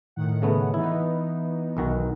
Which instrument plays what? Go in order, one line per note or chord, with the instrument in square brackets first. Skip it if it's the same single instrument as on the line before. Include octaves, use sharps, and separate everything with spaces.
[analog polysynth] A2 D#3 F#5
[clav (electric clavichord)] C#3 A3 B3
[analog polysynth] E3 B3 D#4 [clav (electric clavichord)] E4
[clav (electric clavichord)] B1 D#3 F#4